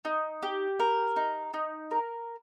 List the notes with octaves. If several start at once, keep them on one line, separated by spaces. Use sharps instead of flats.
D#4
G4
A#4
D#4
D#4
A#4